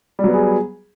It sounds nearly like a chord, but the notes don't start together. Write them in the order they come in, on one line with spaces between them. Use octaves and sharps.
G3 F#3 B3 G#4